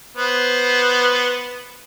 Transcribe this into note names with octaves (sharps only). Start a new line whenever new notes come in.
B3 C5